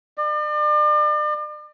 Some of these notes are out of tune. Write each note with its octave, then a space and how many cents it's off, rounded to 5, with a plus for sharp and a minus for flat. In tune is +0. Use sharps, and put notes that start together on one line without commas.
D5 +40